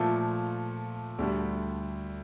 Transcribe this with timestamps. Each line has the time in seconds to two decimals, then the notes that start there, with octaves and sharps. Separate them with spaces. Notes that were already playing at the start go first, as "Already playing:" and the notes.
Already playing: A#2 F3 A3 A4
1.19 D2 D3 G3